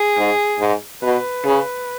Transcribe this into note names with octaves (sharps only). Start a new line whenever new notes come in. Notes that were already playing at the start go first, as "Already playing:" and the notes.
Already playing: G#4
G#2
G#2
B2 B4
C#3